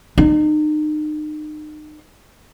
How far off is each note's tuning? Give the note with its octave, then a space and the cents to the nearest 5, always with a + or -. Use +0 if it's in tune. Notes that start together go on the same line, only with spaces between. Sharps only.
D#4 -35